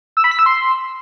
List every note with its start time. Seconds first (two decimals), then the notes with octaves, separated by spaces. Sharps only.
0.17 E6
0.24 B5
0.31 B6
0.39 E6
0.46 C6